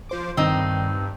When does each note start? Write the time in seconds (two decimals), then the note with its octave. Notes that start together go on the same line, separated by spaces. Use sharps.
0.09 F3 C5 D6
0.37 G2 D#3 C4 D#4